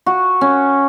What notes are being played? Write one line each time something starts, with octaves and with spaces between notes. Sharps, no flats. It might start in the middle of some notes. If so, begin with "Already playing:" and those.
F#4
C#4